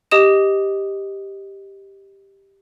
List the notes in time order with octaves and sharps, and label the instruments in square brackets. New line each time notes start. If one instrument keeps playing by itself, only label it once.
[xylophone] G4 D#5 D#6 E7